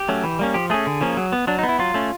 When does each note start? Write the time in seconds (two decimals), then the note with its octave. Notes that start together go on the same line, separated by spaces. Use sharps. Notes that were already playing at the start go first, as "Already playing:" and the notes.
Already playing: G4
0.09 F#3 A3 C#4
0.24 E3
0.39 G3 A#3 C#4
0.54 F3 G4
0.70 A3 C#4 G#4
0.87 D3
1.01 F3 A#3 C#4
1.17 F#3
1.32 B3
1.47 F#3 D4
1.59 D#4
1.63 B3
1.69 E4
1.79 F#3 F4
1.94 A3 C#4